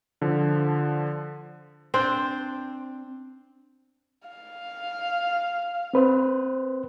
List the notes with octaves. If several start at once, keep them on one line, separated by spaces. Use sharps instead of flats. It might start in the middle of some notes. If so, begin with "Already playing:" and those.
D3 F3
C4 D4 C5
F5
C4 B4 C5